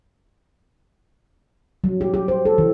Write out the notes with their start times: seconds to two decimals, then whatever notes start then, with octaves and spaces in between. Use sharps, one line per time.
1.84 F#3
2.01 G4
2.14 G4
2.28 C5
2.45 A4
2.58 E3